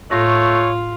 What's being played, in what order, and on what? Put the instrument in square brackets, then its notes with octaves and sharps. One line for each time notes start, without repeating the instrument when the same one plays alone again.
[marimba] A2 C#6 A#6 [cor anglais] A3 [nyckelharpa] F4 [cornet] C#5